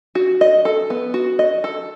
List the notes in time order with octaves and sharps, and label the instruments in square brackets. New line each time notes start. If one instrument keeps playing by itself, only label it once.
[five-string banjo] F#4
D#5
A4
B3
F#4
D#5
A4